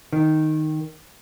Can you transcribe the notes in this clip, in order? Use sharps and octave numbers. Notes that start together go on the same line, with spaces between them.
D#3